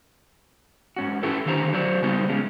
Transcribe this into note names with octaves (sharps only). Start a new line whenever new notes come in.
G#2 C#4 F#4
C#4 E4 G4 A4 B4
D3 D#3 G4 C5 F#5 A#5
F#3 C5 D5
C#3 G3 B3 D#4 C5
F3 G#3 C#4